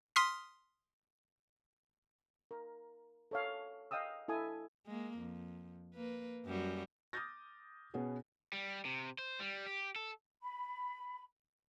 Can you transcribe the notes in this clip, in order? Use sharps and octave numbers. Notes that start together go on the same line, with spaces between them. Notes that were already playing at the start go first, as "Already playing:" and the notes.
C6 D#6 F6 B6
A#4
A4 C#5 F5
D#5 F5 G5 D#6 E6
E4 A4 G#5 D#6
G#3 A#3
F2
A#3 B4
F#2 G3 F#4
D6 D#6 F6 G6 A6 A#6
B2 B3 C#4 F#4 G#4 B4
G3
C3
C5
G3
G4
A4
B5